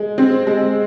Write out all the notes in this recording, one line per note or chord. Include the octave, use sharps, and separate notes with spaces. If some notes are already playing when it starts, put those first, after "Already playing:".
Already playing: G#3
C4
G#3